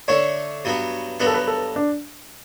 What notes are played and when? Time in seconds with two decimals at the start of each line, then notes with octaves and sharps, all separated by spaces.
0.08 D3 A3 D4 C#5
0.65 G2 F#3 B3
1.20 G2 F#3 B3 B4
1.27 A4
1.34 B4
1.48 A4
1.76 D4